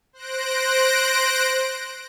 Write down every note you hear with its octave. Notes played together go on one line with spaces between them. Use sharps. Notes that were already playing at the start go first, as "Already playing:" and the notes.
C5 F#6 A#6 D7